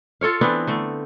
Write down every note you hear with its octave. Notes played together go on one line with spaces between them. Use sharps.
F4 A4 C#5 F5
E3 B3 C4 D4
D3 A3